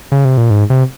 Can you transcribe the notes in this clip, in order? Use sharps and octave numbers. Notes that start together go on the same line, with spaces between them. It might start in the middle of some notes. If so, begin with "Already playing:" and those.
C#3
C3
A#2
G#2
C3